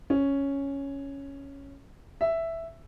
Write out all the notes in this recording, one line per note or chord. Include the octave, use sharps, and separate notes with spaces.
C#4
E5